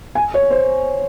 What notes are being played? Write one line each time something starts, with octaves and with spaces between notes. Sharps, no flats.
G#5
C#5
C5